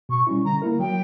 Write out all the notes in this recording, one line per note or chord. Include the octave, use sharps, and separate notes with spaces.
B2 C#6
G3 C#4 E4
D3 A#5
A#3 E4 A#4
F#3 G5